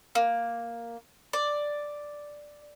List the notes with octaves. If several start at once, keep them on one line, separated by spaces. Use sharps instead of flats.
A#3
D5